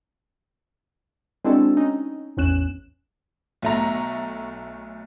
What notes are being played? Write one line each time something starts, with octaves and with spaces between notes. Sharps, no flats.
G#3 C4 D4 E4 F#4 A4
C#4 D#4
A1 E2 C#4 F#6 E7
B1 A3 A#5